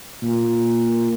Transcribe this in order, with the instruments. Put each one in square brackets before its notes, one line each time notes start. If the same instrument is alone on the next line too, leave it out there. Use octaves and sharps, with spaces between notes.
[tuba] A#2